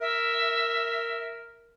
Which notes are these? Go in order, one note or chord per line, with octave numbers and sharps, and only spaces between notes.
A#4 E5